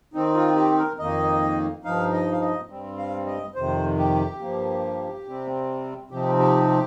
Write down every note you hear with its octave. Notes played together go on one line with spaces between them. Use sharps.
D#3 C4 D#4
F4
G4
A#4
F2 D#3 A#3 D#4 D#5
G2 F3 D#4 F5
D#5
F5
D#5
G2 G3 C4
F5
D#5
F2 C3 D#3 C5
G4
G2 F3 A#3
C3 G3 C4
C3 F3 C4 D#4 G4
G4
G4